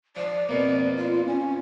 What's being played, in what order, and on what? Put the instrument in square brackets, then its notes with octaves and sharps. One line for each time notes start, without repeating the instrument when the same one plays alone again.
[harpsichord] F3 [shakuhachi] D5
[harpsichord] F2 B2 A#3
[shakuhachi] F4
C#4